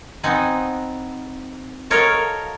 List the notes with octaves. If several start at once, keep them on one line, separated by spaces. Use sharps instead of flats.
B3 C4 D#4 F#5 G#5
F#4 A4 A#4 C#5 D#5 F5